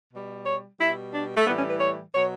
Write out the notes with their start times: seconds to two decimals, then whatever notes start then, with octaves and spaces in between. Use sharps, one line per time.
0.13 B2 G3
0.46 C#5
0.80 B2 G3 E4
1.14 D4
1.36 A3
1.47 A2 E3 G3 B3
1.58 C#4
1.69 B4
1.80 C#5
2.14 B2 F#3 C#5